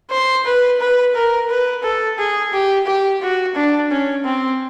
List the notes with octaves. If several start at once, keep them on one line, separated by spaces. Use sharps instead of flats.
C5
B4
B4
A#4
B4
A4
G#4
G4
G4
F#4
D4
C#4
C4